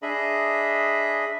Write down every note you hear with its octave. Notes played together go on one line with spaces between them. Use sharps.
D4 G#4 D#5 E5 B5